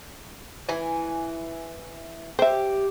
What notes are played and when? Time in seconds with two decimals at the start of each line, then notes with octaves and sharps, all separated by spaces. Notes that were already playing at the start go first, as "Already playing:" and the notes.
0.69 E3 G#5
2.39 G4 C5 E5